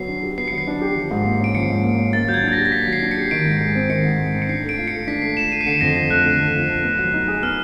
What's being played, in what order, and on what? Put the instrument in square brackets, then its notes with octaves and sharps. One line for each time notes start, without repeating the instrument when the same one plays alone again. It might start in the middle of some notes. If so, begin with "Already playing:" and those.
Already playing: [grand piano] F#3 B3 [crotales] C7
[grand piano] D4
G4
[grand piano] B3 [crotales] C7
[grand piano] F#3 [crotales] C#7
[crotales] C7
[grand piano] D4
G4
F3
G#2
A#3
[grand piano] C#4 [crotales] D7
[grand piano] F3 [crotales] C#7
[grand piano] G#2
A#3
C#4
[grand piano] A#3 [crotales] A6
[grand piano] F#3 [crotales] G6
[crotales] G#6
[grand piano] D4
[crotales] A6
A#6
[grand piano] G4
[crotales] A#6
[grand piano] A#3 [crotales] B6
[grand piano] F#3
[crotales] C7
[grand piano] D4
[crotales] C#7
[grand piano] G4
[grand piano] D#3 [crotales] D7
[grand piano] G#2
G#3
C4
[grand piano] D#3 [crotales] C#7
[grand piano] G#2
G#3
C4
[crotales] C#7
[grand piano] D4 [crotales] C7
[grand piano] A3
[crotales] D7
[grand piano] F4
[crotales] C#7
[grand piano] A4
[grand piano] D4 [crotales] B6
[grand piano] A3 [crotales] C7
[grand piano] F4 [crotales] E7
[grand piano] A4 [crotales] D#7
[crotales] C7
[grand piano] D3 [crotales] C#7
[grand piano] F2 [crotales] A#6
[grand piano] F3 [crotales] A#6
[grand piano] A3 [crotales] F#6
[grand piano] D3
F2
F3
A3
B3
F#3
D#4
G#4
[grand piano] B3 [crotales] F6